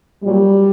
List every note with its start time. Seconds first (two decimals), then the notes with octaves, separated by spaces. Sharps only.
0.24 A#2 F#3 G3